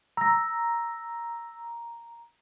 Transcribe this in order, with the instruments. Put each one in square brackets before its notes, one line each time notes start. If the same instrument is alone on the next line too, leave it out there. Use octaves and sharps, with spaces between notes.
[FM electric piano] A#5 [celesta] E6 A#6